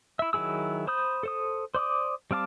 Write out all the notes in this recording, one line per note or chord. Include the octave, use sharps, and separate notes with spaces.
E4 E5
D#3 F#3 E4 G#4 E6
C5 B5 D#6 G6
A4 C5 D#6
C5 D5 D6 D#6
G3 C4 F5 A5 D6